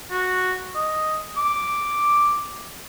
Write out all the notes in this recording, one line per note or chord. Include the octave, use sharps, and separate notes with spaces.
F#4
D#5
D6